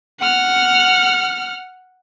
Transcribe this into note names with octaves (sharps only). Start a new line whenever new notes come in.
F#5 F6